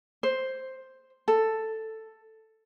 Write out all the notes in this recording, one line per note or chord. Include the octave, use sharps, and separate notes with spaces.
C5
A4